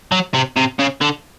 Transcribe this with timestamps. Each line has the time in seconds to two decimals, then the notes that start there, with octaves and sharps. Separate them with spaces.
0.12 F#3
0.34 C3
0.57 C3
0.79 C#3
1.01 D3